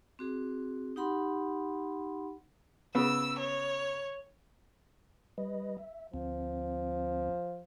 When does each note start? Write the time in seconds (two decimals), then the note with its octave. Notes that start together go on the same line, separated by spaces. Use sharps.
0.19 C4 F#4 G#4
0.96 D#4 G4 F#5 B5 C6
2.95 C#3 B3 E6
3.39 C#5
5.38 G3 B4 D#5
5.78 E5
6.14 D2 F3 C4